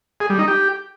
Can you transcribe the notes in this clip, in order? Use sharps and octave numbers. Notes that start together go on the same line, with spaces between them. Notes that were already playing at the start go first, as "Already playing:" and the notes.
G#4
G3
D#4
G4